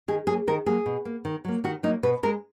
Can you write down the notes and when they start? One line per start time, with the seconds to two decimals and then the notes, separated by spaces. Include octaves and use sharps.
0.08 D#3 G#4
0.27 F#3 A#3 G#4
0.47 D#3 A#4
0.66 F#3 A#3 G#4
0.86 B2
1.05 A#3
1.25 D#3
1.45 F#3 A#3
1.64 D#3 F#4
1.83 F#3 A#3 D#4
2.03 B2 B4
2.23 G#3 A#4